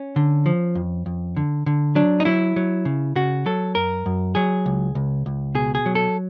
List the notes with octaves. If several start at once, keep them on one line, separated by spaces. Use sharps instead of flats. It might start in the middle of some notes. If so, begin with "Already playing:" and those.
Already playing: C#4
D3
F3
F2
F2
D3
D3
F#3 D4
D#4
F#3 E4
F#3
C#3
C#3 F#4
F#3 A4
F#2 A#4
F#2
F#3 G#4
C#2
C#2
C#2
B2 G#4
G#4
F#3
A4